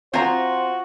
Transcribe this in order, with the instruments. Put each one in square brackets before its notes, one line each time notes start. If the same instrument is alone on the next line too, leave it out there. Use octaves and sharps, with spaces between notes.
[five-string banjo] C4 A#5 [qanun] F4 D#5 [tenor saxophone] F#4 [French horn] C5